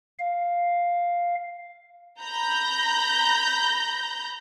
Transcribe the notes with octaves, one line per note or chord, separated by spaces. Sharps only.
F5
A#5 B5 G6 A#6